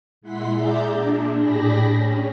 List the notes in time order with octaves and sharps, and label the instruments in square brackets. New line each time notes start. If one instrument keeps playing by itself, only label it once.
[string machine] A#2 G#3 E4 F#5 C6 B6
G#4 D5 E5 A#5 D6 G6
A#2 D4
A2 D4 G4 G#4 B5 A#6
C#4